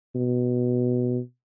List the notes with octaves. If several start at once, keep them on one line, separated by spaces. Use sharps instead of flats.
B2